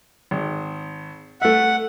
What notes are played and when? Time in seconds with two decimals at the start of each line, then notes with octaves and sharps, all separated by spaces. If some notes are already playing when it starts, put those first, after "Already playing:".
0.31 G#1
1.42 A3 E5 F#5